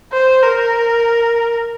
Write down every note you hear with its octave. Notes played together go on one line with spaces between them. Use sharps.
C5
A#4